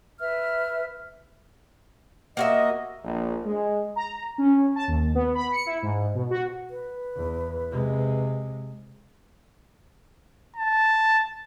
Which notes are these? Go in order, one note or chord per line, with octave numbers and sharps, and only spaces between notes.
B4 E5 F6
A#3 F#4 D#5 E5
A#1
G#3
A#5
C#4
A5
D#2
B3
B5
C#7
E4
G#2
B2
F#4
B4
E2
C3 G#3
A5